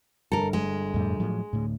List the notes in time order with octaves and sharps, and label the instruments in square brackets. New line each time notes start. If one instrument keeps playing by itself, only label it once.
[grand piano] G1 [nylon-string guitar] A4 A#4
[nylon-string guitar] G#3
[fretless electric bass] F2 A2 G3
A2 F3 F#3
D2 A2